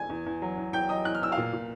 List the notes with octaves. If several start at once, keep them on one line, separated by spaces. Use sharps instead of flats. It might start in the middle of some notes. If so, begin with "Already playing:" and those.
Already playing: G#5 G#6
E2
E2
F#3
E2
E2 G5 G6
F#3 D#5 D#6
E2 F#6
F6
E2 E6
F5 F6
A#2
A#2